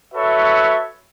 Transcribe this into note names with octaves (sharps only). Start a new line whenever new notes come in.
F#4 A4 B4 C#5 E5